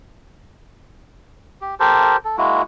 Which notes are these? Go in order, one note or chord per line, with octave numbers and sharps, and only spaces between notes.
G4
G4 A4 A#4 C5
A4
G#3 A#3 E4 F#4